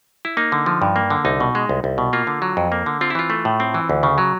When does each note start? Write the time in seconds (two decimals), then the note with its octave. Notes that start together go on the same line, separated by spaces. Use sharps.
0.25 E4
0.37 A#3 D#4
0.52 D3
0.66 F3
0.82 G2
0.96 A#3
1.10 D3
1.25 C2 D#4
1.40 B2
1.55 G#3
1.69 C2
1.84 C2
1.98 B2
2.13 A#3 F4
2.27 D3
2.42 F#3
2.57 F2
2.72 A#3
2.86 D3
3.01 C4 F4
3.10 E4
3.15 E3 F4
3.30 A3
3.45 A2
3.60 C4
3.74 E3
3.90 D2
4.03 C#3
4.18 F#3